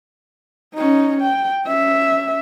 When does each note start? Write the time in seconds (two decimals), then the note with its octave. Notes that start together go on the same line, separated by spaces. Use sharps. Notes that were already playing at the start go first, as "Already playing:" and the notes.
0.74 C#4 D#4
1.21 G5
1.66 C#4 E5